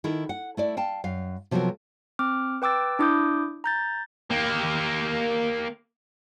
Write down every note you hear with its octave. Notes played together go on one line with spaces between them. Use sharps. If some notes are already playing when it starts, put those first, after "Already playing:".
D#3 E4 A4 A#4
F#5
A3 E4 D5
F5 G5 A5
F#2 F5
C3 F3 F#3 B3 A4 A#4
C4 D6 F6
B4 G5 D6 E6 A6
D4 E4 D6 D#6 G6
A#5 G6 A6
A#3 G4